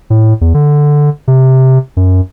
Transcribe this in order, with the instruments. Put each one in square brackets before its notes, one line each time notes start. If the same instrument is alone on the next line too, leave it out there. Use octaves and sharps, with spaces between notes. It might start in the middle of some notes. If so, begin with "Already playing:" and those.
[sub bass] A2
E2
D3
C3
F#2